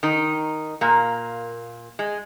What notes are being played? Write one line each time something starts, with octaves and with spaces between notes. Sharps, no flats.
D#3 D#4
A#2 A#3
G#3